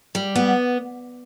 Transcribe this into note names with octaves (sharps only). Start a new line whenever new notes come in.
G3
B3